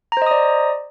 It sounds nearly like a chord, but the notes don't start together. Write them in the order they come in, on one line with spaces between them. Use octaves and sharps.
A#5 C5 D#5 D#6 D5